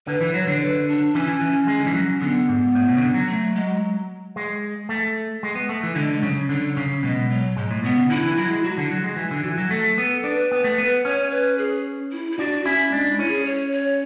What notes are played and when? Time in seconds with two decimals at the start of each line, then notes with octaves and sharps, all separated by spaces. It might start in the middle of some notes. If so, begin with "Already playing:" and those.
0.07 D3 B4
0.21 E3
0.34 F#3 C#5
0.47 D3
0.61 B4
0.88 D4
1.14 E3 C#4
1.28 E3
1.41 E3
1.67 G#3
1.80 D3
1.87 E3
1.94 F#3
2.21 D3 B3
2.49 G#2
2.75 A2
2.88 B2
2.97 C#3
3.01 D3
3.14 F#3
3.28 A3
3.55 G#3
4.36 G#3
4.89 A3
5.43 G#3
5.55 B3
5.69 A3
5.83 E3
5.95 D3 G#3
6.13 G#3
6.22 C#3 F#3
6.49 D3 F#3
6.76 C#3 F#3
7.03 B2 G#3
7.30 F#3
7.57 G#2 G#3
7.71 A2
7.84 B2 B3
7.97 C#3
8.10 D3 E4
8.23 E3
8.37 F#3 E4
8.50 G#3
8.63 F#3 F#4
8.78 D3
8.91 F#3
9.04 G#3
9.17 E3
9.31 D3
9.44 E3
9.58 F#3
9.70 A3 A4
9.97 B3 A4
10.24 D4 B4
10.51 B3
10.64 A3
10.77 B3 B4
11.04 C#4 C#5
11.31 B4
11.58 G#4
12.12 E4
12.32 E4
12.38 D4 F#4
12.65 C#4 E4
12.92 G#3 D4
13.10 E4
13.19 C#4
13.28 G#4
13.45 C#5
13.72 C#5